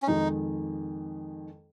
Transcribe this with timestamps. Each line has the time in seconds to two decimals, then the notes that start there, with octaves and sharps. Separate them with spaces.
0.03 C#4
0.07 F2 D#3 G#3 D#4